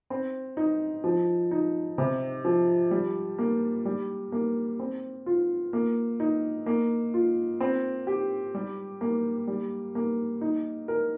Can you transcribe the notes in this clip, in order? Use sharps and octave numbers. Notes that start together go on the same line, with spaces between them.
C4
D#4
F3
D#4
C3
F3
G3
A#3
G3
A#3
C4
F4
A#3
D#4
A#3
F4
C4
G4
G3
A#3
G3
A#3
D#4
A#4